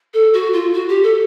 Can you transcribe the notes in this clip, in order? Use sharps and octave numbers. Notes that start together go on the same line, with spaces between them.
A4
F#4
F4
F#4
G4
A4